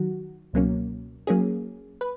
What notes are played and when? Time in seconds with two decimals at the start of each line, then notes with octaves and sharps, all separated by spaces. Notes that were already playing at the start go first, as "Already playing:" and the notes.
Already playing: D#3 F#3 F#4
0.53 C#2 B2 F#3 A#3 C#4
1.27 F#3 A#3 C#4 G#4
2.01 B4